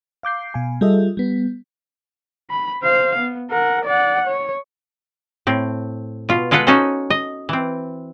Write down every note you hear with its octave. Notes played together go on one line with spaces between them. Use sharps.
F5 D6 G6 C7
B2 F5 G#5
G3 F4 G#4 A4 D#5 E5
G3 B3
B5
C5 F5
B3
A#4 F#5
D5 F#5
C#5
A2 C4
B2 F4
G#3 F4 A4 B4 F#5
C#4 D#4 F#4 A4 C5
D#5
E3 C4